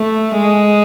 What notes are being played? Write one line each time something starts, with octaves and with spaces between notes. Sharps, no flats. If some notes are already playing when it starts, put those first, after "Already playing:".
Already playing: A3
G#3